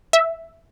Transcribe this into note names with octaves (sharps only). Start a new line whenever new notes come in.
E5